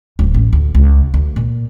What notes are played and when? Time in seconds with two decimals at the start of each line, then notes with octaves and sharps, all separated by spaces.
0.19 D1
0.34 A1
0.53 D2
0.75 C#2
1.14 D2
1.36 A#2